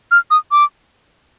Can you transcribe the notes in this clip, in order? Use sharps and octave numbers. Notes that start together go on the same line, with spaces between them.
F6
D#6
D6